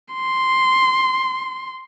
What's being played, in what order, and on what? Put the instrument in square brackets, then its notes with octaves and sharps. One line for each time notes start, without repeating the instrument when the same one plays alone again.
[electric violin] C6